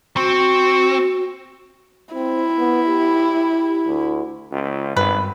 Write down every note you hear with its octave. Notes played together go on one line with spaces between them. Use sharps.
C4 F#4 C#6
C4 E4
B3
G4
D2
C#2
G#1 G2 B4